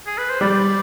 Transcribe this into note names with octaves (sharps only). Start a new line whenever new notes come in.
G#4
B4
C5
G3 D5